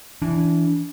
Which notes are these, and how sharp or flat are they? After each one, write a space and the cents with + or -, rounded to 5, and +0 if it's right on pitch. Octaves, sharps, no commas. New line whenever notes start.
E3 +0 D4 -30